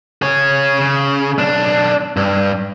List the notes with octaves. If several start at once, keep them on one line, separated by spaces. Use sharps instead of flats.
G#4 C#5
C#3
B1 D4
G2